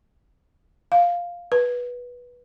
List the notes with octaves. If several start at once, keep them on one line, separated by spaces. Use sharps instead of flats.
F5
B4